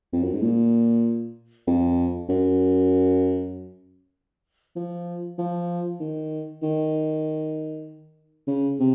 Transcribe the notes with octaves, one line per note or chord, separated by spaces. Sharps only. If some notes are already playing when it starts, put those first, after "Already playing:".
F2
F#2
G#2
A#2
F2
F#2
F3
F3
D#3
D#3
C#3
C3